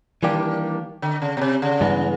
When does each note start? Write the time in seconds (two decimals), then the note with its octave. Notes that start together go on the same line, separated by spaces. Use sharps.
0.23 D#3 E3 G3 A#3 D4 G4
1.02 D3
1.22 C#3
1.37 B2
1.41 C3
1.62 C#3
1.81 G2 E3 G#3 B3